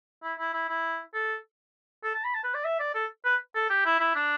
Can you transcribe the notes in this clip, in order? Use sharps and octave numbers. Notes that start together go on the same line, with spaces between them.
E4
E4
E4
E4
A4
A4
A5
B5
A5
B4
D5
E5
D5
A4
B4
A4
G4
E4
E4
D4